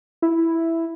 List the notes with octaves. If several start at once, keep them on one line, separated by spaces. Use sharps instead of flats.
E4